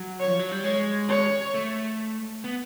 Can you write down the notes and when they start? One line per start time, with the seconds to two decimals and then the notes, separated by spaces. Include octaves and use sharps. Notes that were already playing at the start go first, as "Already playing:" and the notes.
Already playing: F#3
0.20 C#5
0.27 F3
0.39 F#3
0.51 G3
0.64 G#3 C#5
1.09 C#5
1.54 A3
2.44 B3